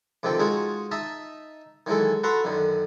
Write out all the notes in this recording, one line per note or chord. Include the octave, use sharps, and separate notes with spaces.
D2 C3 D#3 F3 A4 G5
G#3 C#4 D#4 F4 F#4 G#4
D#4 D#5 E5 A5
D#3 E3 F#3 G#3 A4
F#4 A4 B4 F#5 A#5 C6
F#2 D3 D#3